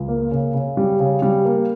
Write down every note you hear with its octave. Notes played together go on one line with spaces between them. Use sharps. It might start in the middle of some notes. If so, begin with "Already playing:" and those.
Already playing: C#2
A#3
C#3
C#3
G3
C#3
G3
A#3